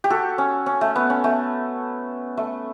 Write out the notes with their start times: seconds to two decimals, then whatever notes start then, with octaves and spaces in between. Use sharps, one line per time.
0.04 G4
0.10 F#4 A4
0.38 C#4
0.66 C#4
0.81 A3
0.96 B3
1.10 C#4
1.24 A3
2.37 A3